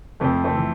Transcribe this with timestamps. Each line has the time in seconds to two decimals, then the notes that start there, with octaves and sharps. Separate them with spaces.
0.20 F2 A3 C4
0.44 A3 C4
0.55 E3